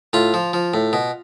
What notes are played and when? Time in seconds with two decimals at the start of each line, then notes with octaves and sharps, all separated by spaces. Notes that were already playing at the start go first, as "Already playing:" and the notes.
0.13 A2 F4
0.34 F3
0.53 F3
0.74 A2
0.93 B2